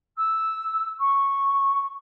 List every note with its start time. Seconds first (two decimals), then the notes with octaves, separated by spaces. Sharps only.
0.17 E6
0.98 C#6